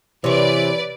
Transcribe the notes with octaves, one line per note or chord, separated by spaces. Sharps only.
C3 E3 B4 C#5 D5